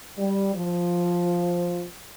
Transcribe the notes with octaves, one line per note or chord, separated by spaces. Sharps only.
G3
F3